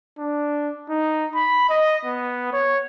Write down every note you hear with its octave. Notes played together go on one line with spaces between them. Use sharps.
D4
D#4
B5
D#5
B3
C#5